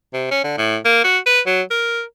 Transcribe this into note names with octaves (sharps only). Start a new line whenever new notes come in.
C3
C#4
D3
A2
A#3
F#4
B4
F#3
A#4